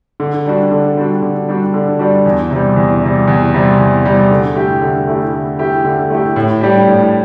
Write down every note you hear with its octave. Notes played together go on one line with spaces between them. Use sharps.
D3
G3 D4 F#4
D3
G3 D4 F#4
D3
G3 D4 F#4
D3
G3 D4 F#4
E2
C3 G3
E2
C3 G3
E2
C3 G3
E2
C3 G3
D3
A3 E4 G4
D3
A3 E4 G4
D3
A3 E4 G4
D3
A3 E4 G4
A2
G3 D4 G4
A2